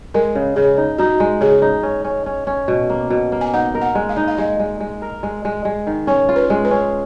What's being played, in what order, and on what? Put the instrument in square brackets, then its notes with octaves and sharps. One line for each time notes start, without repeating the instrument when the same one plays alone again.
[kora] G#3 [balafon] A#4
[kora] C#3
[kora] C#3 [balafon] G#4
[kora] D#4
[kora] D#4 [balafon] F#4
[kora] G#3
[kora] C#3 [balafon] G#4
[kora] D#4
C#4
C#4
C#4
C#4
B2
A#3
B2
A#3
[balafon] G#5
[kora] D#4 [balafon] F#5
[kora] A#4
[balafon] F#5
[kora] G#3
[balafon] F5
[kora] D#4
[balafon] F5
[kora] G#3 [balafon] D#5
[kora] G#3
G#3
A#4
G#3
G#3
G#3
D#3
[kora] C#4 [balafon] C#5
[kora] F4
[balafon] B4
[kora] G#3
[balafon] B4
[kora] C#4